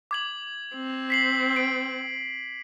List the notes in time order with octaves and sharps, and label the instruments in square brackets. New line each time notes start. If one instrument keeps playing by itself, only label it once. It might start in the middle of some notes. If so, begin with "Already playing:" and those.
[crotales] D6 G#6 F#7
[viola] C4
[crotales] B6 C7 F#7
D7